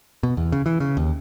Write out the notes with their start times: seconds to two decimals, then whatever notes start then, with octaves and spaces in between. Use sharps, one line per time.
0.23 B2
0.37 E2
0.52 C#3
0.66 E3
0.80 C#3
0.97 D#2